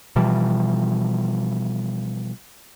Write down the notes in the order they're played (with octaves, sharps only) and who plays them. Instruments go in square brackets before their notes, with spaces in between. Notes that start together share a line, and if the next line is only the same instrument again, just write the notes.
[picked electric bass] B2 E3 F3 G3